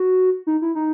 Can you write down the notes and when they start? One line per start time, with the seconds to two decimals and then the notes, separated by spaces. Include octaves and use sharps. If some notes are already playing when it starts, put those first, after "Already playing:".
Already playing: F#4
0.47 D#4
0.62 E4
0.75 D#4